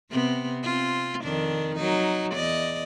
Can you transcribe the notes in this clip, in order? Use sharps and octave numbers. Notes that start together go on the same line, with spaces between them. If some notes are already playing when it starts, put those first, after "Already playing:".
C3 B3 C4
C4 F4
F2 D#3 D4
F#3 D#4
E2 D5 D#5